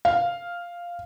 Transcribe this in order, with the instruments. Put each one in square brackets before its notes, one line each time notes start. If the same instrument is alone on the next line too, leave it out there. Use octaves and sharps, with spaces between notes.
[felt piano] F5